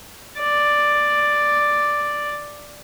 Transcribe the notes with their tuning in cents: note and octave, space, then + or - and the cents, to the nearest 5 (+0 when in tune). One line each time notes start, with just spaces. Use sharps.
D5 +5